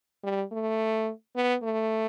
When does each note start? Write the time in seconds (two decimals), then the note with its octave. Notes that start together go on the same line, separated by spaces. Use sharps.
0.24 G3
0.52 A3
1.36 B3
1.63 A3